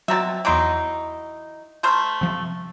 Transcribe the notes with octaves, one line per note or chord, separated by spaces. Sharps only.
B2 F#3 C4 E5 A#5 A6
E2 E3 F#3 D#4 C6 D7
A3 C5 A#5 F6 G6
C3 F3